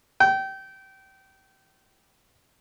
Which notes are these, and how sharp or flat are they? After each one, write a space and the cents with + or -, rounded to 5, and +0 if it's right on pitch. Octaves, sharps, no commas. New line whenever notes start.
G5 -25